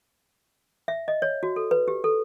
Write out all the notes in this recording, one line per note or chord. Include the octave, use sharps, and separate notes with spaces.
E5
D#5
C#5
F#4
A4
B4
G4
A4